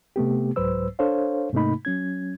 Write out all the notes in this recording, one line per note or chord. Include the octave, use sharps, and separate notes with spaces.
C3 A3 B3 G4
C2 G#2 F#3 B4 C5 E6
D4 A4 C5 C#5 F5
G#2 C3 A3 A#3 D#4 B5
F#3 C#4 G#6